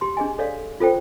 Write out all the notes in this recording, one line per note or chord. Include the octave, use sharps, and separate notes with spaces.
G4 C6
D4 G#4 D#5 G#5
A4 C#5 D5 F5
F4 A4 C5 G5